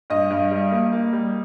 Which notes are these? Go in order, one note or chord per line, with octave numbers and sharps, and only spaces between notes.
G2 D#5
G2
G3
A#3
A#3
G3